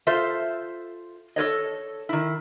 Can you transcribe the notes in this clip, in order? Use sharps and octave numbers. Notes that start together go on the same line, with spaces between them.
F4 A4 C5 E5
A4 B4 C#5 D#5
D#3 E4